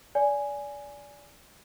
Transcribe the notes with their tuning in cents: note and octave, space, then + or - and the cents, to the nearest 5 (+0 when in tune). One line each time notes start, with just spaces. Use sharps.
D5 -25 G#5 +0